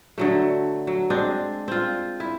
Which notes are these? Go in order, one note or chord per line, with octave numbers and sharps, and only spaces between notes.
D3 F#3 A3
F#3
G#3 C4 D4
C4 F4
E4